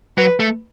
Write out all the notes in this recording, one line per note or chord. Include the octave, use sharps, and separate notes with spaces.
F#3 B4
A3